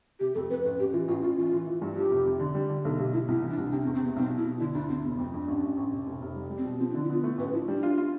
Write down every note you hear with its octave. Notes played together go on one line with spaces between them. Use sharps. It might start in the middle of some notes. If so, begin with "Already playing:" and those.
C3 G4
F2 A4
F2 B4
A1 B4
A1 G4
E3 F4
A1 F4
A1 F4
E3 F4
E3
E3
G2
F3 G4
F1
C3
D3
G3
D3
B1 A4
B1 G4
B1 E4
C2 E4
E3
D4
C2
C3 D4
C4
E2
C4
C3 B3
B1 C4
B2
E4
B2
D3 E4
D2 D4
D2 C4
F1 B3
F2 C4
F2 D4
A1
A1
A1
F1
F1
F1
G3
G3
C4
B2
F3 C4
D4
D3
E4
B3 F4
A3
A1 B4
F3 E4
G3 D4
F4
F4